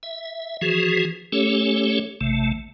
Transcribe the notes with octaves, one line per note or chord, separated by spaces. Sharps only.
E5
E3 F3 F#4 G#4
A3 C#4 G4 A4 C#5
A1 C3 A3